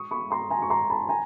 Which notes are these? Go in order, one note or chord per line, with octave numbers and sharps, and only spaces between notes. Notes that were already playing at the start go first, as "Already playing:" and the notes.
Already playing: C#6 D#6
B5 C#6
A#5 C6
G#5 A#5
C#6
A#5 C6
A5 B5
G#5 A#5